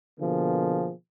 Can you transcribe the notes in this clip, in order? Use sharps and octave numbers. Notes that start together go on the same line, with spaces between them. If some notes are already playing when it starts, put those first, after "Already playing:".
B2 D3 F3 A#3 G#4